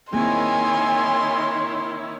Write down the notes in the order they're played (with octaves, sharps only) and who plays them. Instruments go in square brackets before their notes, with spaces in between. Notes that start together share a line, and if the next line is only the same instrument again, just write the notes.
[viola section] D#3 E4 C#5 [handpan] A#3 C4 G#4 [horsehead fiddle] G#5 [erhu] C6